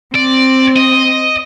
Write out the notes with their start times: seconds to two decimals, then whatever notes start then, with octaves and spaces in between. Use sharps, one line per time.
0.15 C4 D5
0.77 D#5